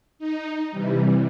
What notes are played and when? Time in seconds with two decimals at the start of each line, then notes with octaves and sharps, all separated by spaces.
0.19 D#4
0.71 C3 E3 G3